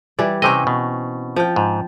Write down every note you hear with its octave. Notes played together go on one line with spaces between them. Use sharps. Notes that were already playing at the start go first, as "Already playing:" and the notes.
E3 G3 D5
C3 C4 C#4 D#5 G5
B2
F3 G5
G#2